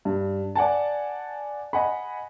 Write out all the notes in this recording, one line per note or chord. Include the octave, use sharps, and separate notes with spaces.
G2
D5 F#5 G#5 A5
D#5 F#5 G#5 B5